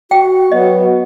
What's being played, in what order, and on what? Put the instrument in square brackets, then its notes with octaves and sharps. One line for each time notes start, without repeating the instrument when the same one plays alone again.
[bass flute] F#4 [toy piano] G5
[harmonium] F#3 B3 [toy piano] D#5